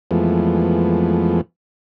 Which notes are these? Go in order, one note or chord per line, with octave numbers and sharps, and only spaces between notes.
F2 E3 F3 G#3 A3 B3